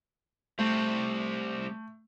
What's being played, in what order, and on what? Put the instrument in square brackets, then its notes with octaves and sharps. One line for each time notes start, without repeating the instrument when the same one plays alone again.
[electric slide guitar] G3 C4 [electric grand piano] A3